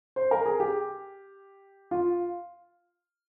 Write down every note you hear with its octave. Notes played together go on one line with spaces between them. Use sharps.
C5
A#4
G#4
G4
F4